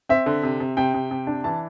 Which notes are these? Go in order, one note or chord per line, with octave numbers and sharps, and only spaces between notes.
C4 E5
D3
C3
C3
C3 G5
C3
C3
D4
E3 A5